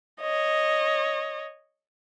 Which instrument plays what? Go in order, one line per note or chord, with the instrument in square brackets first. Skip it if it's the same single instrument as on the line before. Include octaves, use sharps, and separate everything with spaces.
[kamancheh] C#5 D#5